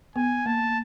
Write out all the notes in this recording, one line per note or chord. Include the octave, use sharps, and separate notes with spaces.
B3 G#5
A#3 A5